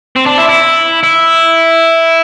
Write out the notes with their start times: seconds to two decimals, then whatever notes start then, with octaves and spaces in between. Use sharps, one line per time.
0.16 C4
0.26 D4
0.38 E4
0.49 E4
1.03 E4